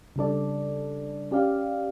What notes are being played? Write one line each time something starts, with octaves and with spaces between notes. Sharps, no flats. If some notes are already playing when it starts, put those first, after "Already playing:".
C#3 G3 D4 A4 D5
C#4 G4 D5 F5